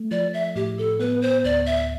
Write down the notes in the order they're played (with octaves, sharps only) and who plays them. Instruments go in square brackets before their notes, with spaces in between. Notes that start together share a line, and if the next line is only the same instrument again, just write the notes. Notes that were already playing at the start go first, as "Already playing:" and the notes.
Already playing: [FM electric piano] A3
[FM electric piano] F3 [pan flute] D5
[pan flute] E5
[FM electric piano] A2 [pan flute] G4
[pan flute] A4
[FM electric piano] B3 [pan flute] B4
[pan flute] C5
[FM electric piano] D2 [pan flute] D5
[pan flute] E5